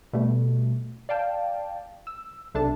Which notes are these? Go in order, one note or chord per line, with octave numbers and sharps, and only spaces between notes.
B2 G3 A3
D5 F5 G5 A5
E6
B1 C3 D4 A4 A5